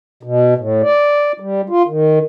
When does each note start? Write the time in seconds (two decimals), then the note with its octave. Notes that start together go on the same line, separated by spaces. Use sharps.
0.23 B2
0.58 A2
0.82 D5
1.40 G3
1.69 F4
1.88 D#3